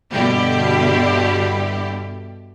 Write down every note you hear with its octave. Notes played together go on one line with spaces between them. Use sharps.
G2 B2 D3 G3 E4 G4